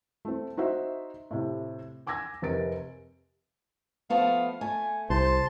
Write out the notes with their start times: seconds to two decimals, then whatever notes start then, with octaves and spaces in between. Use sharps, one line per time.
0.25 A3 C4
0.57 D#4 F#4 C5 E5
1.31 A2 C3
2.07 G#5 D6 E6 G#6 A#6
2.42 F1 C3 A#4 A6 D7
4.10 F3 A3 B3 F5
4.61 A3 G#5
5.10 C2 C5 A5 C6